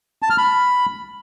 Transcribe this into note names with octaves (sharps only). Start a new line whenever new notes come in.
A5
F6
B5